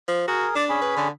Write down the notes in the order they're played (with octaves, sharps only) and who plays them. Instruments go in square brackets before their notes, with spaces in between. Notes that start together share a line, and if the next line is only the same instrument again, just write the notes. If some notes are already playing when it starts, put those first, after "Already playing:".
[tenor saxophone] F3
[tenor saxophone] F#4 [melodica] G#4 A#4
[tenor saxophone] D4 [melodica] D5
[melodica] C#4 G#4 B5
[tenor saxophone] B4
D3